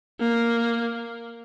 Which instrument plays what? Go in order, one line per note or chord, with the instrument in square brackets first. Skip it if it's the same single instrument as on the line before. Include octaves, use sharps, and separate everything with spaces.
[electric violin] A#3